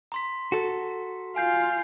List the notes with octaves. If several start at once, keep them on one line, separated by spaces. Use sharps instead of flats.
A#5 C6 B6
F#4 A4
F4 F5 G#5 G6 C7